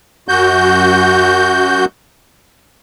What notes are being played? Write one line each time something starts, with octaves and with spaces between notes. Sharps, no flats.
F#2 F#4 G6